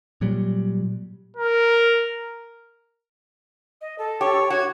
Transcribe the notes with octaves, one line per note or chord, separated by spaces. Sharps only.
A#2 F#3 G3
A#4
D#5
A4
G4 C#5
F#4 C#5 G#6